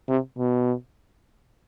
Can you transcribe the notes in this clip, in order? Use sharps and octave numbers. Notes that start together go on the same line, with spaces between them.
C3
B2